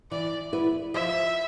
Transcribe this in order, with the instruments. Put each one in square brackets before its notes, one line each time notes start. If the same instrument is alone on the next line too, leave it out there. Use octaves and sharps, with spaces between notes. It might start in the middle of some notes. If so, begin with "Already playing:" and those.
[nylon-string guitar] E3 [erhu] D5
[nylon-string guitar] B3 E4 B4
[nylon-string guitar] F3 [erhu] E5